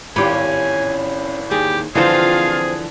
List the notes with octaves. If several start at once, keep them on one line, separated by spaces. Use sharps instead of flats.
G#1 A2 C#4 F4 G4 G#5 B5
D#2 G4 G#4
D3 E3 F3 C4 F4 G#4 C5 F5